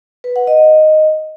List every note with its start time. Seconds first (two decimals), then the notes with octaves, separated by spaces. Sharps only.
0.24 B4
0.36 F#5
0.47 D#5